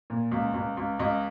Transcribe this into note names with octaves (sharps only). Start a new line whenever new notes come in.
A#2
C#2
C#2
C#2
C#2 D#5